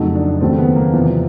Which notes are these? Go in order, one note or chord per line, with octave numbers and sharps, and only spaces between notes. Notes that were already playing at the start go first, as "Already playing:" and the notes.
Already playing: F2 C#3 F#3 A3 D#4
D4
D#2 C#3 F#3 A3 C4
B3
A#3
E2 C3 F3 B3